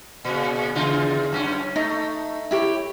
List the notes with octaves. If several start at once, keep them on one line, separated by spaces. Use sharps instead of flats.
A#2 C#3
E2 C#3 F4
F#2 C#4
A3 D#4
E4 G4 C#5